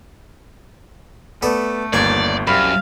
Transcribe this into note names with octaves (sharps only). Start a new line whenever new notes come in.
A3 B3 A4 D5
G1 D#2 A#3 D5 C#6 G#6
C2 F#2 F5 B5